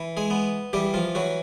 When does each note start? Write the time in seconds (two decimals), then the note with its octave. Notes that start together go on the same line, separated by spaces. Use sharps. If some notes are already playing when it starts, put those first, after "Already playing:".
Already playing: E3
0.17 G#3 G#4
0.31 B3
0.73 E3 G3 G4
0.94 F3 F4
1.15 E3 F#3 F#4